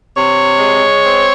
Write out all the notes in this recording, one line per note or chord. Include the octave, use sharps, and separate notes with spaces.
C3 C#5
G#3
C4